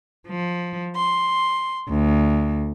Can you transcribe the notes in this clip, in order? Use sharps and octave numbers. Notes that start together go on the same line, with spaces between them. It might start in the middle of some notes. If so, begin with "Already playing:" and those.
F3
C6
D2